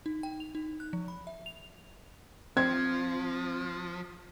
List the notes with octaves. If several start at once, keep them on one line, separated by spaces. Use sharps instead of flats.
D#4
G5
F7
D#4
F#6
F3
B5
E5
F7
F3 C4 G#6